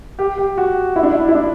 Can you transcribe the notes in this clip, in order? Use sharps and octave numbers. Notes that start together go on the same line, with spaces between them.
G4
G4
F#4
E4
D4
E4
E4
D4